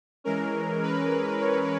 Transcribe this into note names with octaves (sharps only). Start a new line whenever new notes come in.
E3 G#3 C#4 A#4
B4
C#5